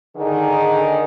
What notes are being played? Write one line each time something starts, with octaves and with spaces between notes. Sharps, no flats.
D3 D#3 G#4